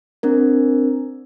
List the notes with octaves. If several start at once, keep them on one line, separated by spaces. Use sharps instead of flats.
C4 D4 A#4